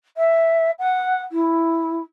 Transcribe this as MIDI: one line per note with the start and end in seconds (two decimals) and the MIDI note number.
0.17 0.71 76
0.79 1.21 78
1.32 2.00 64